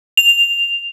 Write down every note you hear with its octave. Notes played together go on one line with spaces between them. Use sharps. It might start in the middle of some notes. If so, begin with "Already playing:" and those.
F7